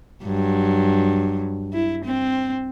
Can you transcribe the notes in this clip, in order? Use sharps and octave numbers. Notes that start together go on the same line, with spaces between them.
G2 F#3
E4
C4